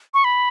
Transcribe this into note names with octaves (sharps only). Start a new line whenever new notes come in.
C#6
B5